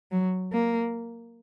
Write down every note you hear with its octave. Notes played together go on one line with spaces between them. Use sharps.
F#3
A#3